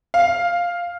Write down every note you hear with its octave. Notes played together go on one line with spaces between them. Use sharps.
F5